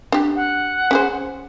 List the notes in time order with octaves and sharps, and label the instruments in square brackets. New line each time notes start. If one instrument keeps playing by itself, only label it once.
[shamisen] D4 G4
[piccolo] F#5
[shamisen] C#4 G#4 C5